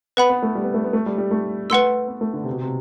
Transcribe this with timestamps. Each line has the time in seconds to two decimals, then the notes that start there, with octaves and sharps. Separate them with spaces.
0.17 B3 B4 F#5 B5
0.29 B3
0.43 A3
0.55 G3
0.64 B3
0.74 A3
0.84 B3
0.93 A3
1.06 G3
1.18 G3
1.31 A3
1.70 A3 B4 F#5 C6 E6
2.08 B3
2.21 A3
2.33 D3
2.44 C3
2.52 B2
2.62 C3